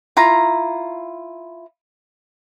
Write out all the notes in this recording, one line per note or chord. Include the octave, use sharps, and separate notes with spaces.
E4 F4 A#5